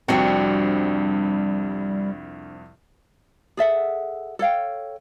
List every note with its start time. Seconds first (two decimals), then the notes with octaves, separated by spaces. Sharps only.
0.08 C2 F2 G3 C4 D4 F#4 C#7
3.57 G#4 A4 E5 F#5
4.39 A4 C#5 F5 G5